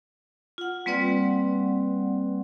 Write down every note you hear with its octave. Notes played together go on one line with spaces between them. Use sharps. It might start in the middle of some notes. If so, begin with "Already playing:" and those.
F4 F#5
G3 A#3 C4 B4 D5 F#5